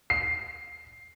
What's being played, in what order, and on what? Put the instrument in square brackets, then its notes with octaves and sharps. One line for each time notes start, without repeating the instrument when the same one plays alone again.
[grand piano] C7